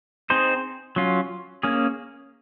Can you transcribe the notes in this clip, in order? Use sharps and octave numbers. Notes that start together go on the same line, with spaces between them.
C4 D#4 G#4 C5
F#3 C#4 F4
A#3 C#4 G#4